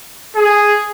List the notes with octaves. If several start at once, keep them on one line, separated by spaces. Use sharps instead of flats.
G#4